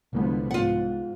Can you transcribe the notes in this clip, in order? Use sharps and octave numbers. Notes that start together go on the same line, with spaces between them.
C2 D3 E3 F3 G#3 B3
G#2 F4 F#5